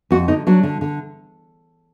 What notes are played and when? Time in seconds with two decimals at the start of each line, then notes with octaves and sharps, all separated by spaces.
0.11 F2 F#4
0.28 D3 D#4
0.47 F#3 D4
0.63 D3
0.81 D3